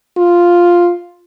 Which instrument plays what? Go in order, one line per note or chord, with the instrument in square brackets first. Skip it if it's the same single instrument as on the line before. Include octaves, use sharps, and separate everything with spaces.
[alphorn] F4